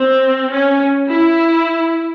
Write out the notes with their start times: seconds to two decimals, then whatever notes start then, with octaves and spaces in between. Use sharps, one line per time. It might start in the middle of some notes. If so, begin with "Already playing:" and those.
Already playing: C4
0.51 C#4
1.10 E4